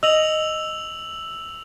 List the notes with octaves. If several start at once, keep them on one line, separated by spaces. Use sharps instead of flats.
D#5 E6 F7 F#7